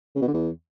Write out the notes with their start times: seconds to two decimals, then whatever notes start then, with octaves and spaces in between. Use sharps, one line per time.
0.16 C#3
0.22 B2
0.28 D3
0.34 E2